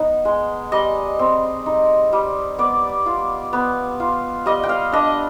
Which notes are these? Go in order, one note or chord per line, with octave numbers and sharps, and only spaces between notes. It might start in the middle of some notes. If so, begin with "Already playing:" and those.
Already playing: B3 D#4
G#3
G3 D#5
C4
D#4
G3
B3 D5
F4
B3
F4
G3 D#5
G5
F5
D4 D#5